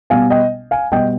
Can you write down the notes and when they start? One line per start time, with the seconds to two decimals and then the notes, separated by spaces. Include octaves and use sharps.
0.10 B2 G3 B3 F5 G#5
0.30 D#5 G5
0.71 F5 G#5
0.92 B2 G3 B3 D#5 G5